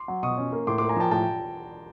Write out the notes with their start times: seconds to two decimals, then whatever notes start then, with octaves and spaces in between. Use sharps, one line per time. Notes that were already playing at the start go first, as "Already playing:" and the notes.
Already playing: C6 D6
0.08 F#3
0.23 B2 C#6 D#6
0.37 C#4
0.52 A#3
0.67 A2 C6 D6
0.78 C6 D6
0.81 A#3
0.89 G#5 A#5
0.97 F3 G5 A5
1.11 A2 G5 A5